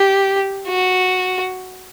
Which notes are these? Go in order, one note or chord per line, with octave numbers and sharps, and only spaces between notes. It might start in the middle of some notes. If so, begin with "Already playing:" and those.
Already playing: G4
F#4